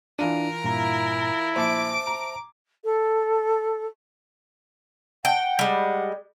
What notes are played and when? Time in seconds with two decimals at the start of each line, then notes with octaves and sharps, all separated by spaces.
0.19 E3 D4 E4 F4 A#4 D#7
0.64 G2 A#2 E4 A#5
1.56 A#1 C5 E5 A5 D6 D7
2.07 A#5
2.84 A4
5.25 F#5 G5
5.59 G3 G#3